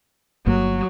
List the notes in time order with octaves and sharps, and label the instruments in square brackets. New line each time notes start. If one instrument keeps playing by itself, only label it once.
[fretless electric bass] G1 G2 A#3 [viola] F#3